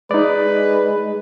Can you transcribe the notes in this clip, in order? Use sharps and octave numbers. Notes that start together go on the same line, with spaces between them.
G#3 D#4 B4 D5